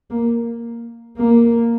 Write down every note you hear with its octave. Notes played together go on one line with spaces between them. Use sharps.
A#3
A#3